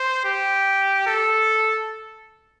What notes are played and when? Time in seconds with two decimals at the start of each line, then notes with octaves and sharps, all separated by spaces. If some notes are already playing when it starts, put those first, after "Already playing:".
Already playing: C5
0.24 G4
1.06 A4